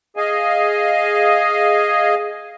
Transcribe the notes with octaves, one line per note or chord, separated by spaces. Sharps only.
G#4 D#5 F5 G#5